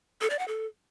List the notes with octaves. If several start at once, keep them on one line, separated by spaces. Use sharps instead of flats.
A4
D5
F#5
A4